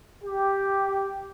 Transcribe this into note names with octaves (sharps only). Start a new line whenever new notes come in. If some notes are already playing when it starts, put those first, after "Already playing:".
G4